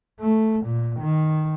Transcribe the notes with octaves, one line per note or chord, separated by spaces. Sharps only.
A3
A#2
D#3